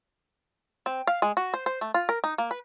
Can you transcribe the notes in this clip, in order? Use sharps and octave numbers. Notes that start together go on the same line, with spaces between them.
C4
F5
G#3
F#4
C5
C5
A3
F4
A#4
D#4
A#3
B4